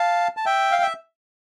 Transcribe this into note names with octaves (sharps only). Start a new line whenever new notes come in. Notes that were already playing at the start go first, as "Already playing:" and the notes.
Already playing: F5 A5
A5
E5 G5
F5
E5